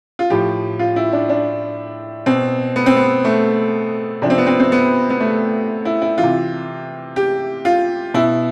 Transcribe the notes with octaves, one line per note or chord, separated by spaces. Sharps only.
F4
A2 F3 G4
F4
E4
D4
D4
B2 C4
B3
C4
B3
A3
C3 F3 D4
C4
B3
C4
C4
B3
B3
A3
E4
E4
E3 F4
C3
G4
F4
B2 E4